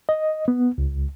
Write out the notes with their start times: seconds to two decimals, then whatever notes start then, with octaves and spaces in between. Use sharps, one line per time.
0.09 D#5
0.48 B3
0.78 C#2